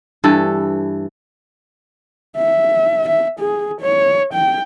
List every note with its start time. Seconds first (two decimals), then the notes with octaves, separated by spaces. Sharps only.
0.24 G2 E3 A4
2.37 E5
3.09 E5
3.40 G#4
3.81 C#5
4.33 G5